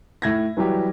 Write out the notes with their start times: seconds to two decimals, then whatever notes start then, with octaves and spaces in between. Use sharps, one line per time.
0.22 A2 G#6 A#6
0.57 E3 F#3 G3 G4